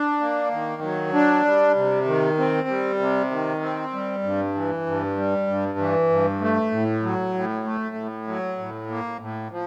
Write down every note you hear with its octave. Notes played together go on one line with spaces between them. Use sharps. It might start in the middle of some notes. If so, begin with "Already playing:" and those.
Already playing: D4
A#3
D#3
F#3
D4
G3
C3
D#3
C4
G3
C3
D#3
C4
G3
G2
E3
G2
G3
G2
E3
G2
A3
A2
F#3
A2
A3
A2
F#3
A2
A#3
A2
F3